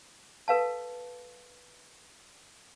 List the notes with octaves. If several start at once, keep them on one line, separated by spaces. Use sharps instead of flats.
A4 B4 F5 A5